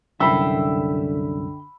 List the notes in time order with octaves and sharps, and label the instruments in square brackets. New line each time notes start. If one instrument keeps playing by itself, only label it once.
[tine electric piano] C2 F#2 [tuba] D3 [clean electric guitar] E5 G5 [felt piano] B5 E6